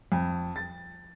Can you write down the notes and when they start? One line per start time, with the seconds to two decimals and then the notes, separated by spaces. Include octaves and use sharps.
0.12 F2
0.56 A6